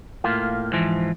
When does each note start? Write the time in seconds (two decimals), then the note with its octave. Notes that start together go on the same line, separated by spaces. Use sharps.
0.24 A2 A#3 F4
0.73 G#2 E3 F3